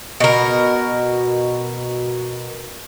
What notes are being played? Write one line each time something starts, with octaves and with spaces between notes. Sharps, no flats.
B2 A#4